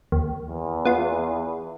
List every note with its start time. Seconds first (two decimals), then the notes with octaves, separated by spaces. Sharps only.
0.12 D#2
0.47 E2
0.85 B3 F4